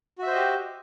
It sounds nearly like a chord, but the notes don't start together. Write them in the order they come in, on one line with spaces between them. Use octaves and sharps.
F#4 E5 C5 D#5 G4